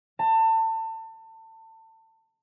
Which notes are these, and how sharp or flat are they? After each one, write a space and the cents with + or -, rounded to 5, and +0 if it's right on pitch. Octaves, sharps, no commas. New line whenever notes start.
A5 +30